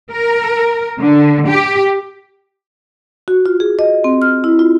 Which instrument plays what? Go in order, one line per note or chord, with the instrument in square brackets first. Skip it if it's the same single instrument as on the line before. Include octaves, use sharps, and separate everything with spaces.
[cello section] A#4
D3
G4
[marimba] F#4
F4
G#4
D#5
C4
F6
E4
F4